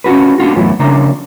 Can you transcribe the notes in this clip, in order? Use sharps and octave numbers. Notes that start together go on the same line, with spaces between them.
C#4 F4 F#4 B4
A#3 D4 F4 F#4
F#2 A2 E3 B3
C#3 F3 A#3 D4 A#5